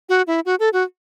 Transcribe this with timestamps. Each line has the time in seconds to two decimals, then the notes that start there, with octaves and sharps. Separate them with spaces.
0.09 F#4
0.27 E4
0.46 F#4
0.60 A4
0.73 F#4